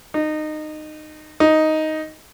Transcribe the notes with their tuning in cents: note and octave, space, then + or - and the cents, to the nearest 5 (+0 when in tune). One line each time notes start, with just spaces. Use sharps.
D#4 -20
D#4 +5